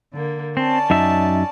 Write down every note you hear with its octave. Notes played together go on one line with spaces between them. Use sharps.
D3 A#3
C4 C#4 D5 A5
F#2 D#4 E5